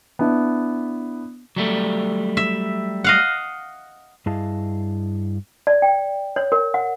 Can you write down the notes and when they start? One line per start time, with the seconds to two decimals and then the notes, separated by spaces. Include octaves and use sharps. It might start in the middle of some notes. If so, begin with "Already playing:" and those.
0.19 B3 D4 E4
1.56 F#3 G3 A3
2.37 E5
3.04 D#5 F5 F#5
4.26 G2 E4 G#4 D#5 F5 A5
5.67 D5
5.82 G5
6.36 C#5
6.52 A#4
6.74 F#5